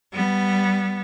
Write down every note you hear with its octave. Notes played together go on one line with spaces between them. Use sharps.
G3 B3